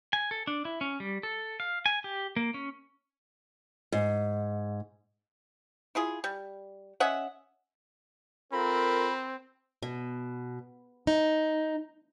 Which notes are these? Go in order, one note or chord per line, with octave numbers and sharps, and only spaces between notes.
G#5
A4
D4
E4
C#4
G3
A4
F5
G#5
G4
A#3
C#4
G#2
E4 F4 G#4
G3
C#4 D#5 E5 F#5
C4 F4 A4 A#4 B5
B2
D#4